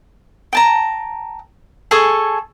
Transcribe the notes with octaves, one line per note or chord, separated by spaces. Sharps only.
G5 A5 A#5
G#4 A4 G#5 C#6